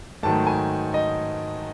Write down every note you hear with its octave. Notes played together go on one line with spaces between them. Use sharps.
G#2 D#3 F#3 A3 A5
G#5
D#5